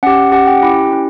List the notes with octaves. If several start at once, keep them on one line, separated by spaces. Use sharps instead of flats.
C#4 G4 F#5
C#4 G4 F#5
G5
C#4 E4 G4
C#4 E4 G4